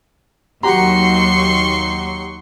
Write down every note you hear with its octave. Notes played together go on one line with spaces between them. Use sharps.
D#2 F#3 F#4 G4 A#5 C6 C#6